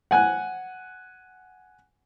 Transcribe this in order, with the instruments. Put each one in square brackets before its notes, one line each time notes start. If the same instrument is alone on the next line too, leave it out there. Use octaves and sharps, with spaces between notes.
[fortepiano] F#5 G#5 F#6